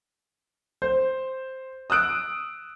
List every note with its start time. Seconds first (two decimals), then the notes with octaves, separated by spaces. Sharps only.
0.82 C5
1.90 D#6 E6 F#6 D7